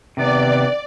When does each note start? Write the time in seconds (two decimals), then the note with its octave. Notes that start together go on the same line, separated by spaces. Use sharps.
0.17 C3 D#3 B3 D5